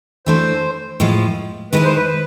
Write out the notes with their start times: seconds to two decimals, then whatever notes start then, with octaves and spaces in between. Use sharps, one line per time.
0.26 E3 A3 D4 F#4 A4 C5
1.00 A2 F3 G#3
1.73 D#3 G#3 B3 E4 G#4 B4
1.84 C5
1.96 B4